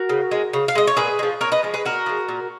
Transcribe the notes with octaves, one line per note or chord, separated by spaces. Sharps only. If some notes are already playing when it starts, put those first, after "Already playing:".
Already playing: F#4 A#4
C#3
G#3
C#3
F5
G#3 D#5
C#5
A#2 G#4 B4
G#3
F3
A#2 A#4 C#5
B4 D#5
F3 G#3
G#4 B4
A#2 F#4 A#4
F3 G#3
A#2